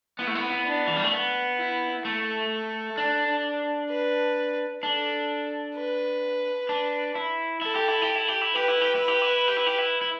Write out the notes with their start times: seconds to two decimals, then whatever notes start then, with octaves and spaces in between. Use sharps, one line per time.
0.19 B3 E4
0.27 A3
0.35 B3
0.66 D4
0.88 E3
0.96 G3
1.04 A3
1.12 B3
1.58 E4
2.04 A3 A4
2.98 D4
3.90 B4
4.83 D4 A4
5.76 B4
6.69 D4
7.15 E4
7.62 E4 A4
7.76 G4
7.88 E4
8.02 G4
8.15 E4
8.28 G4
8.41 E4
8.55 G4 B4
8.68 E4
8.81 G4
8.95 E4
9.08 G4
9.22 E4
9.48 G4
9.57 E4
9.66 G4
9.78 E4
10.01 E4